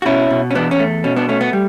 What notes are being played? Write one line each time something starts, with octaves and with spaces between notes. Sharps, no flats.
F#4
B2 C#4 E4
B2
C#4
E2 B3 D4
C#4
A3
B2 C#4
B3 D4
A3 C#4
B3
G3